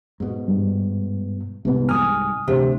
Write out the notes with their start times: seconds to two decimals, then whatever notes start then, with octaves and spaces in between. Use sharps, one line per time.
0.20 G#2 B2
0.48 G2
1.65 C2 G#2 C3 B3
1.89 G#5 D#6 F6
2.48 D2 C3